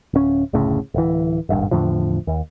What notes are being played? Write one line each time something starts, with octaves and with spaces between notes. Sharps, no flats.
D1 C#4
F#1 D2 A2 C#3
D1 E3
D#1 G#1 G2
E2 A2 D3 F3
D#2